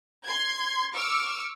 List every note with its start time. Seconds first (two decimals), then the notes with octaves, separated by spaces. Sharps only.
0.25 C6 G#6
0.94 C#6 D6 E6 F6